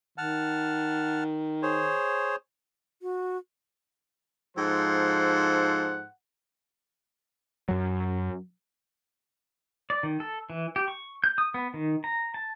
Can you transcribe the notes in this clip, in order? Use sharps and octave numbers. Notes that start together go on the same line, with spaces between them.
D#3 F#5 A5 F6
G#4 C5 C#5
F#4
G#2 F3 A4 C5 F#5
F#2 F#3
D5
D#3
A4
E3
G4
C#6
G6
D#6
B3
D#3
A#5
A5